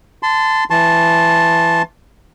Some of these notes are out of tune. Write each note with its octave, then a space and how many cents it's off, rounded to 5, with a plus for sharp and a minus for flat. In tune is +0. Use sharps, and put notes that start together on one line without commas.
A5 +0 C6 -25
E3 +15 A5 -5 C6 +25